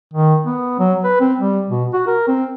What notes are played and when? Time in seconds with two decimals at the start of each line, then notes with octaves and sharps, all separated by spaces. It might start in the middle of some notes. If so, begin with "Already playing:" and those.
0.13 D#3
0.46 B3
0.79 F#3
1.04 B4
1.20 C4
1.40 G3
1.70 B2
1.93 F#4
2.07 A#4
2.28 C4